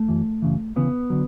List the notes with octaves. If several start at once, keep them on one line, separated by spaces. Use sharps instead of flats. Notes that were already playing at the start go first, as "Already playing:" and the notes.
Already playing: A3
F#2 E3
F#2 C#3 E3
D2 C#3 E3 B3
D3 F#3